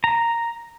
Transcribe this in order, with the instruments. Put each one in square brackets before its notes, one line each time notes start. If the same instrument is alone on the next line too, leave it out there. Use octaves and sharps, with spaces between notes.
[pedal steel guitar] A#5